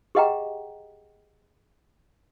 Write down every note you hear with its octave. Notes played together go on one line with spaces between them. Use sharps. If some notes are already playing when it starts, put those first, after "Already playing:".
G4 G#4 D#5 F#5 G5 A#5